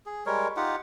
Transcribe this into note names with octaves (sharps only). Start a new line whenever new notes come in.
G#4
G3 G#3 A#4 C#5
D#4 F4 G4 F#5